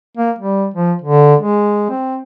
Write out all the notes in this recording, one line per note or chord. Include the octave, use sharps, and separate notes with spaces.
A#3
G3
F3
D3
G#3
C4